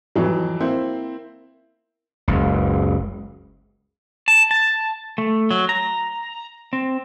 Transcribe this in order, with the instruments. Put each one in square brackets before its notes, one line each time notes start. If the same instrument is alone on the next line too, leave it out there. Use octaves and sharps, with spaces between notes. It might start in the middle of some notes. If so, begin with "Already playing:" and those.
[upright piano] F2 E3 F#3
A#3 C4 E4 C5
[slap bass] F#1 C#2
[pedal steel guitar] A5
A5
A3
F#3
A#5
C4